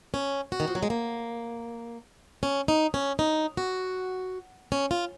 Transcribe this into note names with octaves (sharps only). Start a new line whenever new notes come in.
C#4
F#4
D#3
F3
F#3
G#3
A#3
C#4
D#4
C#4
D#4
F#4
C#4
F4